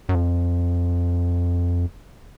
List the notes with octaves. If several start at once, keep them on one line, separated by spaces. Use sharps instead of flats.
F#2
F2